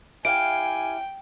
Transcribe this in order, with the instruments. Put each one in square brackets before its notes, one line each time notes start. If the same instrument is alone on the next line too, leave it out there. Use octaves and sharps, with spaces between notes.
[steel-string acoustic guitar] E4 G4 F5 [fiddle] G5 [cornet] G#5 [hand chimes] D7